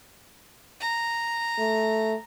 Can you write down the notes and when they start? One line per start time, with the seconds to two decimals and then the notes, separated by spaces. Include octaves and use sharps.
0.81 A#5
1.59 A3